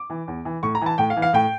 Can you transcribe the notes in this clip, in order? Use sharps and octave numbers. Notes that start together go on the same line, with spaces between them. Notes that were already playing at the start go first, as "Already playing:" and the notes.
Already playing: D6
E3
E2
E3
A2 C#6
A#5
E3 A5
A2 G5
F5
E3
F5
A2 G5